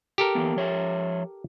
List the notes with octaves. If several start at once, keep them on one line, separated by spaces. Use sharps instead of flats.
G4 A4 A#4
E3 A#3 B3
F3 C#5 E5